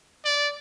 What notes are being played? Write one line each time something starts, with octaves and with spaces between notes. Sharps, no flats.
D5